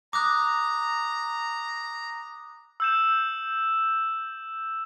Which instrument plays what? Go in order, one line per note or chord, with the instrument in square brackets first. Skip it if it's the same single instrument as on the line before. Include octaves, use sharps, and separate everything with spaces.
[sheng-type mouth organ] A#5 [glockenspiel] D6 D#6 F#6
[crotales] E6 G6 E7